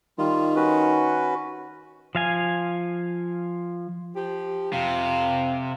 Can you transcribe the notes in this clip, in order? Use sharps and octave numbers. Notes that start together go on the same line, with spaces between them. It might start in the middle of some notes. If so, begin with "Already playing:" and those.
D#3 G3 F4
C#4 F#4 B4
F3 F5 G#5
F3 G4
F2 C3 F5